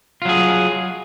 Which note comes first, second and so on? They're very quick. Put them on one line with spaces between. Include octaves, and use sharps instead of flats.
F4 F#3 G#4